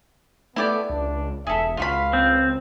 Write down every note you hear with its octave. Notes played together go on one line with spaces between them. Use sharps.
A3 B3 E4 G4 D5
C#2 D4
E1 G#4 A4 E5
C#2 F4 F#4 F5 B5
C#2 C4